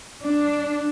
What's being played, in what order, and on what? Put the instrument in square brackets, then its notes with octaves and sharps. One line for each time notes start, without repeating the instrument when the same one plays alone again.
[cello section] D4